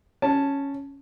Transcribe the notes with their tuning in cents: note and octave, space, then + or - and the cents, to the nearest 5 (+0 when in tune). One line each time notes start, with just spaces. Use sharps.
C#4 +0 A5 +0